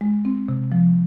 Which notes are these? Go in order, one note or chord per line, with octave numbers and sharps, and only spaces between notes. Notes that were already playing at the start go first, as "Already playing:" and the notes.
G#3
C4
C3
F3